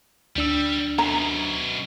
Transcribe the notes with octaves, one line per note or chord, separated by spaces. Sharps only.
D2 G3 D4 E6
F#2 B2 A#5